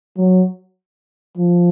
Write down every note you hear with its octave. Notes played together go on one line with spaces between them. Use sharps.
F#3
F3